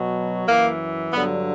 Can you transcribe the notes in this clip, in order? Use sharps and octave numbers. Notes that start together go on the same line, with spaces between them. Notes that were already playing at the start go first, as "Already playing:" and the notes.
Already playing: B2 F#3
F#2 E3 A#3
G2 D3 F#3 B3